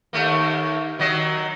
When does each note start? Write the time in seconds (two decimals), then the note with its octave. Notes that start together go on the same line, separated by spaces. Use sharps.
0.13 D#2 A3 A#3
0.99 D#3 F#3 D#5